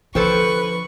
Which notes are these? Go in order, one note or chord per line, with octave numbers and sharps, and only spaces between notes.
D3 F3 A4 B4 C5 G5 C#6